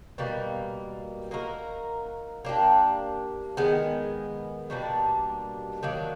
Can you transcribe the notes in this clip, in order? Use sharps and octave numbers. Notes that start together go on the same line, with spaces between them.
B2 G3 A#3
A#3 D#4 F#4 A#4
A#3 D4 G4
D#3 G#3 B3
B2 G3 A#3 D4
D#3 F#3 A#3 D4